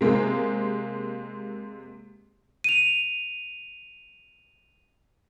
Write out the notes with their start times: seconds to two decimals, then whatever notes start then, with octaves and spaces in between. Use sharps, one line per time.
0.01 C3 G#3 A#3 C4
2.64 D#7 F7